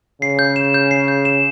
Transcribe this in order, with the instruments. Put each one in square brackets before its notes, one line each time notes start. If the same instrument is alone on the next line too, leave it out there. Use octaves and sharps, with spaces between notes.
[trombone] C#3 [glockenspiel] C7
[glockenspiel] G6
E7
G6
C7
G6
E7